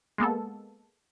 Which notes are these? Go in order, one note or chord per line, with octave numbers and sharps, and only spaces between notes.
G#3 A#3 B3 A4